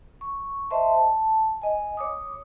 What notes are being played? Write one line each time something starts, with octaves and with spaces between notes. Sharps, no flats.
C#6
C5 D#5 E5 A5 C6
A5
D#5 G#5
C#5 D6 D#6